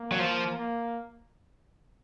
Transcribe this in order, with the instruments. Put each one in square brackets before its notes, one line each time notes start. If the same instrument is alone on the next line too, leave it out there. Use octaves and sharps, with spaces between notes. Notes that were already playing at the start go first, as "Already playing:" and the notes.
Already playing: [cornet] A#3
[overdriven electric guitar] F#3
F3
[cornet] A#3